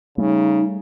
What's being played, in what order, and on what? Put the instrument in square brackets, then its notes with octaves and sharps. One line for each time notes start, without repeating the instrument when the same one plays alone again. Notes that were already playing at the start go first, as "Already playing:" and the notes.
[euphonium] C#3 [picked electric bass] G3 A3 [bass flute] D#4